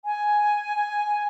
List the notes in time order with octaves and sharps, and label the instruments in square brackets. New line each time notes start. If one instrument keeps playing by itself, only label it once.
[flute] G#5